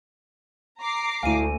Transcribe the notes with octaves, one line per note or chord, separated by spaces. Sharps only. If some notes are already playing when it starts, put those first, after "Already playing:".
A#5 D6 C7
D2 A3 E4 F5 G#5 D#7